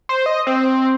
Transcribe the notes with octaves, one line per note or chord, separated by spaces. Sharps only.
C5
D#5
C4